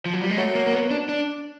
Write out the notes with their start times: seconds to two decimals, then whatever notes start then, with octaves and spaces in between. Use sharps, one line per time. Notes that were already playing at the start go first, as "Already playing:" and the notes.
0.06 F3
0.14 F#3
0.21 G3
0.30 G#3
0.38 F#3 A3
0.55 A#3
0.66 A#3
0.73 B3
0.91 D4
1.09 D4